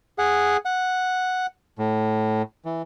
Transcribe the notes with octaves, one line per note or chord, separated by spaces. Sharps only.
G#4 F#5
F#5
A2
E3